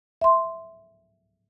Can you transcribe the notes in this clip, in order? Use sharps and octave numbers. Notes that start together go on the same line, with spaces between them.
E5 C6